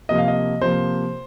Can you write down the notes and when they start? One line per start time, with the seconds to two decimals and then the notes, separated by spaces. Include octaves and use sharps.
0.09 C3 F3 A#3 D#5
0.18 F5
0.28 D#5
0.61 C3 F3 A#3 C5